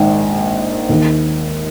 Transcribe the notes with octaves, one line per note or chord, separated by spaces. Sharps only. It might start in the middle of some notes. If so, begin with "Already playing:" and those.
Already playing: A#1 G#2 D#3
D#2 D#3